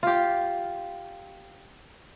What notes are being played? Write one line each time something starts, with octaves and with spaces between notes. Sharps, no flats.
F4 G4